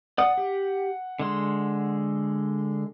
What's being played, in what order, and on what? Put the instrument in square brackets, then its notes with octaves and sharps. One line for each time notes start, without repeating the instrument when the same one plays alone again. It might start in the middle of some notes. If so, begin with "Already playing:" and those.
[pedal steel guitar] D5 D#6 [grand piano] F#5
[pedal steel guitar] G4
D3 G#3 C6